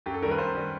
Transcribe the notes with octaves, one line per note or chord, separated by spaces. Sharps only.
F#2 G4
A4
D#3 G3 A#4
B4
F#2 C5
D#3 G3